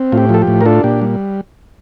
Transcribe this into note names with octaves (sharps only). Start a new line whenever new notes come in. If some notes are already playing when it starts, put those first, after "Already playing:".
Already playing: C4
A2 F4
G4
F3 A4
G4
A2
A#4
D4 F4 A4
A#2 G4
G3